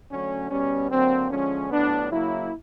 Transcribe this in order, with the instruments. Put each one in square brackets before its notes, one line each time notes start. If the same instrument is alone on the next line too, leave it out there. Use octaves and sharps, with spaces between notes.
[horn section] D3 F#3 A3 C#4
B2 G3 B3 C#4
D3 F#3 A#3 C4
D3 F3 G#3 C#4
A2 F#3 B3 D4
C#3 F#3 A#3 E4